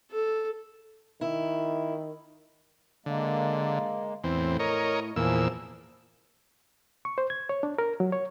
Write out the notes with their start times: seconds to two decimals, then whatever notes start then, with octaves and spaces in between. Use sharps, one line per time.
0.11 A4
1.21 D#3 E4
3.06 D3 G#3 A#3
4.24 E2 A2 C4
4.59 A#4 C#5 D#5
5.16 E2 A#2 F3 G#4 E6
7.05 C#6
7.18 C5
7.30 G#6
7.49 C#5
7.63 D4
7.78 A#4
8.00 F#3
8.12 C#5